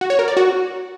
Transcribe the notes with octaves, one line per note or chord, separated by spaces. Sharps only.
F#4
C#5
A#4
D5
F#4